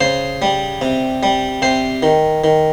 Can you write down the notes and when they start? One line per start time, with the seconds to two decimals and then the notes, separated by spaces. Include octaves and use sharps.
0.01 C#3 C5
0.42 G3
0.82 C3
1.23 G3
1.62 C3 C5
2.03 D#3
2.44 D#3